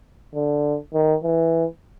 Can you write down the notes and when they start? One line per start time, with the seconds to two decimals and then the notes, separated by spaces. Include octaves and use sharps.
0.35 D3
0.94 D#3
1.23 E3